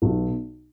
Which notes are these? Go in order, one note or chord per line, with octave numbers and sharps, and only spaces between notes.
B1